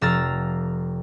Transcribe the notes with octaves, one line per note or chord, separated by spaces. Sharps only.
F1 A#5 E6 F6 A6